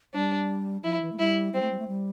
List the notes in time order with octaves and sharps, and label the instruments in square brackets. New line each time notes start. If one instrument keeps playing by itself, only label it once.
[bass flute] G3 [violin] D4
[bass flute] F3 [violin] E4
[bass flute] E3
A3
[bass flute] G3 [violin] E4
[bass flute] G3 [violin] C4
[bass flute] A3
G3
A3
G3